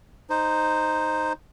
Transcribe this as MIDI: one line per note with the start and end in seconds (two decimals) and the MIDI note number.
0.30 1.33 63
0.30 1.33 72